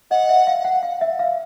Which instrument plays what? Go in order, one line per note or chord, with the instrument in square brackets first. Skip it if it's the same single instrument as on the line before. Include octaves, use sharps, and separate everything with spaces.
[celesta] D#5 [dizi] F#5
[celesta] E5
F5
F#5
F5
E5
F5